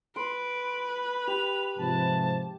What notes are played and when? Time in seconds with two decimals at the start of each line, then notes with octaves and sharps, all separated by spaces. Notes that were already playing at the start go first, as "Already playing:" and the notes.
0.16 B4 C6 D7
1.27 G4 F7
1.78 G#2 C3 F3 A5